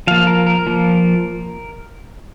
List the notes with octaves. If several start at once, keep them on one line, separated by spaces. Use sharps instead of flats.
F3 A#3 F5
A#4
A#4
F3 A#3